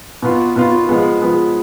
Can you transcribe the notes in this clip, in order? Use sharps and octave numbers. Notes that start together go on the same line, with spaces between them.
B2 B3 F4
B2 B3 F4
F3 G#3 B3
F3 G#3 B3